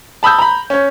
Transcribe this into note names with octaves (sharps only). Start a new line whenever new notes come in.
A5 B5 D#6 E6 G6
A#5 B5
C#4 C#5